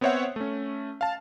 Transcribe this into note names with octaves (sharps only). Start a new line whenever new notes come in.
B3 C4 C5 C#5 E5 F#5
A3 C#4
F5 A5